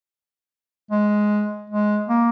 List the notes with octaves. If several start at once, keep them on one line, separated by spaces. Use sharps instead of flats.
G#3
G#3
A#3